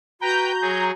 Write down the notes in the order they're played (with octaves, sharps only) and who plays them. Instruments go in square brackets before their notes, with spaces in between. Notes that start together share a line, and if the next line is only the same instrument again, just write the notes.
[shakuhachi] F#4 [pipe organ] B4 G5 [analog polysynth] A#5 G6
[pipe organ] F#3 G#4